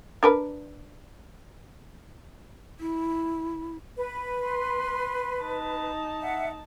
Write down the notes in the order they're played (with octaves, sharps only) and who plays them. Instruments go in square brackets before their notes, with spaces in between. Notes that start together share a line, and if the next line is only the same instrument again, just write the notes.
[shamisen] D4 A#4 B4
[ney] E4
[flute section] B4
[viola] C6
D#4 A5
[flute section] E5 F#5